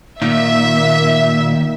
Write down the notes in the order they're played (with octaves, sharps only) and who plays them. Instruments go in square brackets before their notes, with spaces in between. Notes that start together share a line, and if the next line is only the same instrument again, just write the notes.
[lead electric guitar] A#2 [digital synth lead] D#3 [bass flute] A#3 [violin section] E5